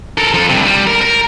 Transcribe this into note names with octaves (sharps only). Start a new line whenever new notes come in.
A4 A#4
F3 A4
G2 C3
G3
A#4
A#4